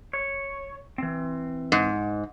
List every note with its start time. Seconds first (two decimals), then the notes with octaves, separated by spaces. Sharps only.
0.13 C#5
0.98 E3 C4
1.72 G#2